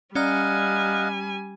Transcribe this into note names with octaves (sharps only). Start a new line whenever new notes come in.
G3 C#4 D5 D#5 F5 F#5 G#5 A#5